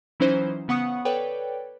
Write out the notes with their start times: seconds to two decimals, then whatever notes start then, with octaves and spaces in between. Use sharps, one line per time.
0.20 E3 F#3 C#4 D#4 E4 C5
0.68 C#3 B3 F#5 C#6 D#6 C#7
1.05 A4 B4 C#5 D5 G5